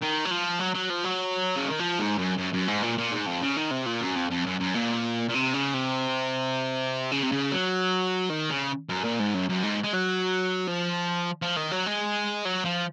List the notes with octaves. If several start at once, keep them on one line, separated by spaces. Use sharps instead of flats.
D#3
F#3
F3
F#3
F#3
F3
F#3
C#3
D#3
F3
G#2
F#2
F#2
F#2
G#2
A#2
A#2
G#2
F2
C#3
D#3
C3
A#2
F#2
F2
F2
F#2
F#2
A#2
A#2
C3
C#3
C3
C#3
C3
C#3
F#3
D#3
C#3
F#2
A#2
G#2
F#2
F#2
G#2
G#3
F#3
F3
F3
D#3
F#3
G#3
F#3
F3